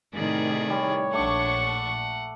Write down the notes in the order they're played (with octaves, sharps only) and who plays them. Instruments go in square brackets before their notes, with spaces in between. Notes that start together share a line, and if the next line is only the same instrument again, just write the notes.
[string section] A2 C3 D#3 [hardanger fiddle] G#4 D5
[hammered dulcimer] G3 [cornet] C#5
[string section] A#1 D4 C#6 [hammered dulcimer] A3 D6 [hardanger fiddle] F#5